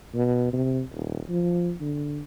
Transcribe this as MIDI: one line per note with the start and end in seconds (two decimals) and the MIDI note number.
0.15 0.50 47
0.53 0.82 48
0.91 1.20 27
1.29 1.72 53
1.81 2.21 50